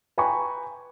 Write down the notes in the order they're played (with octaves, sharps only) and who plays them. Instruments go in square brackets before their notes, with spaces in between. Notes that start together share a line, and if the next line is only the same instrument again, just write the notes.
[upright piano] B4 G5 G#5 A#5 B5 C#6